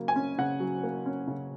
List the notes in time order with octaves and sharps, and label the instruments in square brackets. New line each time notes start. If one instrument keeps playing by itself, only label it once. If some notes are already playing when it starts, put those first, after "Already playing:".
Already playing: [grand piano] C#3 F#3 A#3
G#5
C#4
C#3 F#5
F#3
A#3
C#4
C#3